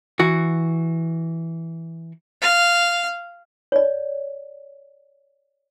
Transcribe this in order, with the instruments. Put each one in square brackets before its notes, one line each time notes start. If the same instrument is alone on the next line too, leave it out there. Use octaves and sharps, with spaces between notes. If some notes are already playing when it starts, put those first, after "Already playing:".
[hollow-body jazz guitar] E3 F#4
[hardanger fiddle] F5
[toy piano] C#5 D5